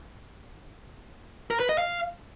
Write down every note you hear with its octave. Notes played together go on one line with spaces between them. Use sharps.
A#4
B4
D#5
F5